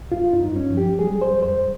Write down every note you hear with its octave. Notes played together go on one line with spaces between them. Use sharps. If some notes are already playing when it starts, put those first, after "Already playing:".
Already playing: C2
G2 F4
D#4
G2
C#4
F3
G4
G3 G#4
C5
F2
C5